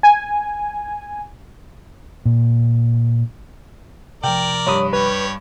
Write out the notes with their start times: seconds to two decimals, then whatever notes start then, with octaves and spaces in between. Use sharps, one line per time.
0.03 G#5
2.25 A#2
4.24 C3 F3 A#4 D5 G5
4.67 G2 C#5 B5 D#6
4.93 G3 B4 C#5